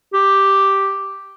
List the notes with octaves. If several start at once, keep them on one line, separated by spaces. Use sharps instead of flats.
G4